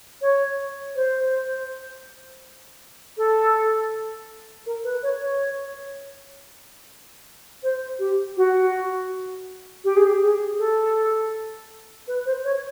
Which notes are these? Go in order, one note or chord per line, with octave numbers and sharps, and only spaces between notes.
C#5
C5
A4
A#4
B4
C#5
C#5
C5
G4
F#4
G4
G#4
G4
G#4
A4
B4
C5
C#5